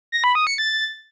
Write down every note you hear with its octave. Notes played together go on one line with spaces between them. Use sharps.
A#6
B5
D#6
C#7
A6